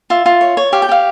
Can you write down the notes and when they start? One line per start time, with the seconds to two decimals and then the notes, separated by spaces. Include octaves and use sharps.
0.10 F4 E5
0.26 F4
0.41 C#5
0.57 C#5
0.73 G4 F5
0.82 G5
0.89 G4 F5